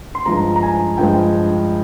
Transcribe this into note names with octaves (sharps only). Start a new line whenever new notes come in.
C6
G2 F3 G#3 A#5
A#5
G#5
G2 F3 G#3 G5